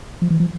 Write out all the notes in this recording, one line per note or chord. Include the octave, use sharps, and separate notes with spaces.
F3
E3
F3